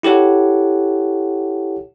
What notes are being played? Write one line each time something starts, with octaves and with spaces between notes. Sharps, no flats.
E4 G4 A4 C#5 F#5